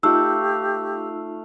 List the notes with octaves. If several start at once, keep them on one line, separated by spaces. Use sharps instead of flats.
A3 D#4 F4 G4 F5 E6